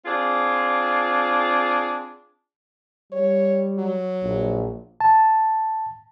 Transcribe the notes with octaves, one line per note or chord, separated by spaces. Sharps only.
C4 D4 F4 G#4
G3 C#5
F#3
A#1
A5